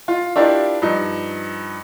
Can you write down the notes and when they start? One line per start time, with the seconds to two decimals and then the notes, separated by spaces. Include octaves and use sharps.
0.08 F4
0.36 D4 E4 F4 G4 A#4 D5
0.82 G2 F3 D#4